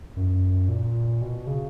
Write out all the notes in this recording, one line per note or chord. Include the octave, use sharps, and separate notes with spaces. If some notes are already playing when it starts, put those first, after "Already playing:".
F#2
A#2
B2
C#3